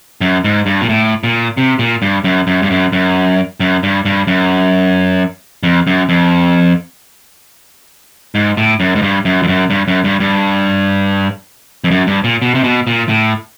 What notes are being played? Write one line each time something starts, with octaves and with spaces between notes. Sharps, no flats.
F#2
G#2
G2
A#2
A2
A#2
C3
A#2
G2
F#2
F#2
G2
F#2
F#2
F#2
G2
G2
F#2
F2
F#2
F2
G#2
A2
F#2
G#2
G2
F#2
F2
F#2
G2
F#2
G2
G2
F2
F#2
G2
A#2
B2
C3
B2
A#2
A2